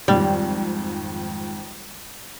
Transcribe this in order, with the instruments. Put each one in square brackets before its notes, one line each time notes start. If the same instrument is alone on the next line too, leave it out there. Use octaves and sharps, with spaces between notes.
[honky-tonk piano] F2 G#2 D#3 [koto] G3